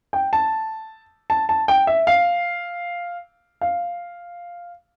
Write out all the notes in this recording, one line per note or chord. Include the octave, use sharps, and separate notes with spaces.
G5
A5
A5
A5
G5
E5
F5
F5